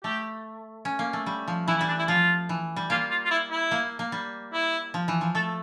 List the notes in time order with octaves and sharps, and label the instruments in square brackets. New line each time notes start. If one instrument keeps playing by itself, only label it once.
[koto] A3 [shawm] G4
[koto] C#4
A#3
A3
G3
F3
[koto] E3 [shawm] E4
[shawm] E4
[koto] G3
[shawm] D4
E4
[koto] F3 [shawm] F4
[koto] E3
G3
[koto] A#3 [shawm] F4
[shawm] F4
F4
E4
E4
[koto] A#3
A#3
G3
[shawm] E4
[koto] F3
E3
F3
[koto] A3 [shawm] A4